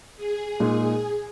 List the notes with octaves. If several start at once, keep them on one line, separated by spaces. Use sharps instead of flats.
G#4
A#2 G#3 D#4